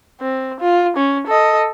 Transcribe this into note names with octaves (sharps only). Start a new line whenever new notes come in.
C4
F4
C#4
A4 D#5